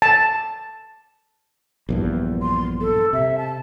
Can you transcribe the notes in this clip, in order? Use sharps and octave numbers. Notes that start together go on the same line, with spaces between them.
A5
A#1 E2 G2
C6
A4
C3 E5
A5